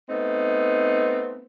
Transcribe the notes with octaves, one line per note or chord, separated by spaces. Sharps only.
A3 B3 C4 D#4